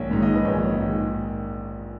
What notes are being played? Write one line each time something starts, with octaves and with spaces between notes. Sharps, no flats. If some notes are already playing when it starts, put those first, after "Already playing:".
Already playing: A#1 G#2 D#3 C#5
G#2 D#3
D#5
B4
A#1 C#5
G#2 D#3